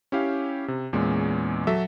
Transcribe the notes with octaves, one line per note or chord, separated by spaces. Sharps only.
C#4 E4 G4 F5
C3
E2 A#2 G#3 C#4
F#3 A4 E5